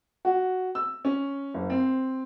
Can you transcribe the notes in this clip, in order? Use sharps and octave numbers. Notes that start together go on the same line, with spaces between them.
F#4
E6
C#4
F#1
C4